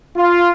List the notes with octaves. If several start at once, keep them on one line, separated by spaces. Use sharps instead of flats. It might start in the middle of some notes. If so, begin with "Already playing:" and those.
F4